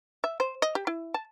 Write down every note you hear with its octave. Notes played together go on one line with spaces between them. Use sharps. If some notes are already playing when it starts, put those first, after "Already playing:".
E5
C5
D#5
G4
E4
A5